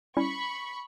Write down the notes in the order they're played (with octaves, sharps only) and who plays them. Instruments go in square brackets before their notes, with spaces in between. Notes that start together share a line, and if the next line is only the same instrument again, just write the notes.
[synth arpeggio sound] G3 C#4 E4 [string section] B5 C#6